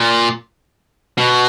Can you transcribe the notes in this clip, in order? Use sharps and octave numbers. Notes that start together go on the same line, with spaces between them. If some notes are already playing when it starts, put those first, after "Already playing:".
Already playing: A#2
B2